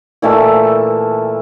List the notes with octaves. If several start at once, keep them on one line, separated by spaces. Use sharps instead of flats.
A#2 E3 A3 A5